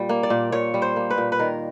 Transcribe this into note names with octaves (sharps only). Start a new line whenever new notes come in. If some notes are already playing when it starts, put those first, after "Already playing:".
Already playing: A#2 G3
A#3
D5
A#2
A#2 C#5
G3
C5
A#3
B4
A#2
B4
D#3 A#4